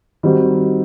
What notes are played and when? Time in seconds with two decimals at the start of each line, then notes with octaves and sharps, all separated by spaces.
0.23 D#3 G3 C4 D#4 F#4